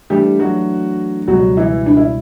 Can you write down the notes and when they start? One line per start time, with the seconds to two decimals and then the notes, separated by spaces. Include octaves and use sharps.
0.10 E3 G3 A3 D4 G4
0.39 F#3 F#4
1.28 C#2 B2 F#3 G3 F#4
1.57 E3 E4
1.86 D4
1.97 E4